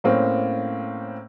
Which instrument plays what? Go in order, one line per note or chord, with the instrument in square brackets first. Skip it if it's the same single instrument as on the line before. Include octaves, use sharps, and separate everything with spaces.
[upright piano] A2 A#3 C4 C#4